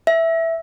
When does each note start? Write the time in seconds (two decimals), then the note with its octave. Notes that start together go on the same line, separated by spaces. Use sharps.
0.07 E5